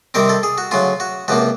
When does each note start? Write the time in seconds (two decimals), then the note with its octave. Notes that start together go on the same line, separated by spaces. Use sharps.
0.14 C3 D#3 G3 C4 A#4
0.29 A4
0.43 G#4
0.58 F#4
0.71 D2 C#3 F#3 F4
1.00 F#4
1.28 C#2 C3 F3 A#3 F#4